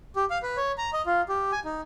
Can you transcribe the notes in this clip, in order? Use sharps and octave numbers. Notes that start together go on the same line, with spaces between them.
G4
F5
B4
C#5
A#5
D#5
F4
G4
G#5
D#4